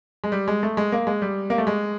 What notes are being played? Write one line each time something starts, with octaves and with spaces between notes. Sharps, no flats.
G#3
G3
G#3
A3
G#3
A#3
G#3
G3
A#3
A3
G#3